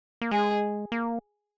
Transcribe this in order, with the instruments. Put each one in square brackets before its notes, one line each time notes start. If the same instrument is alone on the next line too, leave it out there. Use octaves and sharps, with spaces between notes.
[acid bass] A#3
[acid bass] G#3 [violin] G#4
[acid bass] A#3